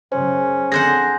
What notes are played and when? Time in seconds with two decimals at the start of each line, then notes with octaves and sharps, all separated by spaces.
0.12 F#2 C#3 C#4 C5
0.72 F2 D3 C4 G#4 C5 F#5 G6 A#6